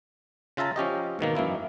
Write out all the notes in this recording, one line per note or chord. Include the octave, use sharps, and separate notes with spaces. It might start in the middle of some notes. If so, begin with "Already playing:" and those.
C#3 F4 E5 A5 A#5
F3 C#4 G4 D#5
G#2 B2 D#3 A#3
F#2 E3 A#3 E4